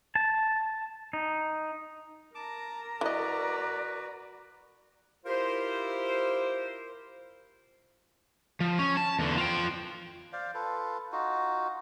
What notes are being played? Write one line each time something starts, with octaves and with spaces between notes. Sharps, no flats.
A5
D#4
A#4 A5 A#5 D6
E3 F#4 B4 D5 D#5
E4 F4 G4 A#4 C5
F3
C#4
A5
E2 D3
F4 G5
C5 D5 F5
F4 A4 B4
D#4 F4 F#4